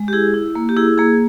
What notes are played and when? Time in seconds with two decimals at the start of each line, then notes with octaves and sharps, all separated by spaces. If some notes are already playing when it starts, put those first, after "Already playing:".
Already playing: G#3
0.08 G4
0.13 E4 G#4
0.34 E4
0.55 A#3
0.69 G4
0.77 E4 G#4
0.98 A#3 G#4